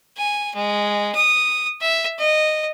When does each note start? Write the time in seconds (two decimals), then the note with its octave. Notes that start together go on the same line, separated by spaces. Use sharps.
0.17 G#5
0.55 G#3
1.15 D#6
1.81 E5
2.19 D#5